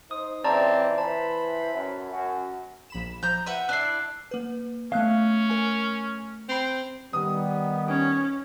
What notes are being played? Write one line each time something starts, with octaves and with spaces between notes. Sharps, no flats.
D#4 C5 D#6
C#2 C#3 E3 C4 D5 A5 A#5
E3 C5 A5 B5
F#2
F#2 F#4
A#1 B5 E7
F3 A#5 G6
B4 E5 F#5 D#7
D4 E4 E6 F#6 C7
A#3 B4
A3 B3 C#4 F5 F#6
A#4 G#5
C4 B5 C7 F7
D#3 G3 B3 D#6
C#4